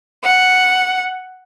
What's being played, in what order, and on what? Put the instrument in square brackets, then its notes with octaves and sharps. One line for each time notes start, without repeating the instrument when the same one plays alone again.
[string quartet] F#5